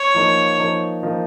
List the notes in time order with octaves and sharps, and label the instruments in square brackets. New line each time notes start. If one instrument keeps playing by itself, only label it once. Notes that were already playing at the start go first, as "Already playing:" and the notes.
Already playing: [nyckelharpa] C#5
[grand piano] F3 A#3 D#4
F3 A#3 D#4
F3 A#3 D#4